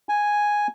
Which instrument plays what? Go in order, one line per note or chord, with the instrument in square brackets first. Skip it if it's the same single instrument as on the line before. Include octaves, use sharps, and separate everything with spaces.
[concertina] G#5